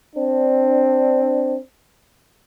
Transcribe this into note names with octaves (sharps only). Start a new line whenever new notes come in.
C4 D4